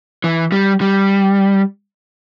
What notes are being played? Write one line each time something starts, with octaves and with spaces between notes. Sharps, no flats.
E3
G3
G3